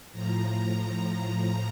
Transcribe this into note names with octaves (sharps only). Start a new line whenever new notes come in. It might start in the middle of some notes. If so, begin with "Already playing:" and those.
A2 F3 A#5
A#5